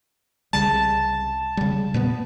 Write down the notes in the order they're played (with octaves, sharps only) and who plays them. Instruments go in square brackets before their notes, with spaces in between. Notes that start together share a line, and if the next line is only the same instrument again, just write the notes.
[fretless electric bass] C2 C#3 G3 [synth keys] A5
[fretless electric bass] C#3 G3
A#2 A#3 B3